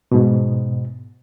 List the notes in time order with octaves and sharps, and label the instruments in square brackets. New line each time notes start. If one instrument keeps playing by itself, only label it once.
[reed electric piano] G#2 B2